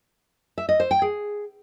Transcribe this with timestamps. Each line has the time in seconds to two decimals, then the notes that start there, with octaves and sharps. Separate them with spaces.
0.58 E5
0.69 D#5
0.80 C5
0.91 G5
1.02 G#4